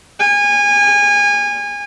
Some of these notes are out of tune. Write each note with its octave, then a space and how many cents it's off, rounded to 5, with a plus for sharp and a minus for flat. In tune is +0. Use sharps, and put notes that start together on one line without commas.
G#5 -25